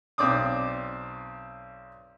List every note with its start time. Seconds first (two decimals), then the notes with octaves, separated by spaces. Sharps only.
0.18 B1 C4 D5 D6 D#6